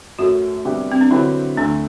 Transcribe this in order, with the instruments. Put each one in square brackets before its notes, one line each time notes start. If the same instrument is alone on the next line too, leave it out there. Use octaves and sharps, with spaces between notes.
[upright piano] F#2 F#3 A3 [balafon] F#4
[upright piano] C3 G3 B3 D4 G4
[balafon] C4
D4
[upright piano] D3 F#3 C4 G4 B4 [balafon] E4
[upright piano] D2 D3 A3 [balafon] D4